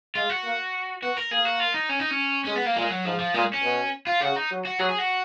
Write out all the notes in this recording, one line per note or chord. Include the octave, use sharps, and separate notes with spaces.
G#3 F4
F#4
A#3
B3 F#4
A#4
A#3 G#4
F#4
F4
D#4
C#4
D#4
C#4
G#3 C#4
B3
A#3
A#2 G#3
F#3
G#2 F3
F3
A#2 G#3
C#4
B2
F4
C#3 F#4
D#4
F#3
F#4
F#3 G#4
G#4
F#4